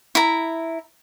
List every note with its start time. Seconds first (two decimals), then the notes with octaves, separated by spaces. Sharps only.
0.15 E4 A#5